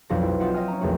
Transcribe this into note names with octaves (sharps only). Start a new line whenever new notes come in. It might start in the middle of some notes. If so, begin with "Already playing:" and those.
B1 F2 F3 C4 D5 A#6
E4
C4 F4 D#5 E5 F#5 G5
D#5 E5 G5 G#5 E6 F6
C#4 A#5
A#1 E2 A3 C4 F#4